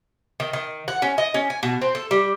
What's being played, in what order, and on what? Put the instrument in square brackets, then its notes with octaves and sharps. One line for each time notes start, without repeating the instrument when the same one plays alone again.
[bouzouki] D#3
D#3
F#5
C#4
D#5
C#4
G#5
B2
C4
A4
G3